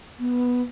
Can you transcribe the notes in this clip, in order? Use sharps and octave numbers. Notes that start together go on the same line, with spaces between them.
B3